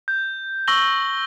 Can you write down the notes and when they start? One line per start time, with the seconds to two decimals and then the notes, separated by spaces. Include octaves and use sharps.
0.08 G6
0.68 C#6 E6 A#6 F#7 G7